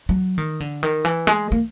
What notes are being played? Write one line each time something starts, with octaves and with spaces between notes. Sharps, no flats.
F#3
D#3
D3
D#3
E3
G#3
A#3